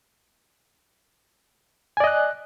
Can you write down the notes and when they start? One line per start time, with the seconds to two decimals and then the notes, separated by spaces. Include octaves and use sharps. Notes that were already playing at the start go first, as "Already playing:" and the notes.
1.97 G#5
2.00 D5
2.04 D#5
2.07 F#6